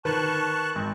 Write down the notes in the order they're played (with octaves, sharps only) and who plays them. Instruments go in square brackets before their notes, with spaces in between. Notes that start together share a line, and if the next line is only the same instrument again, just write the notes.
[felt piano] D#3 A#4 B4 [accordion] A5 C#6 F#6
[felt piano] G#1